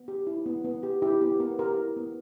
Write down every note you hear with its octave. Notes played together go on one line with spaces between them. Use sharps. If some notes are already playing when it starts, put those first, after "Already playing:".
Already playing: B3
G4
E4
B3
B3
G4
E4 G4
B3 G4
B3 A#4
G4 A#4
E4
B3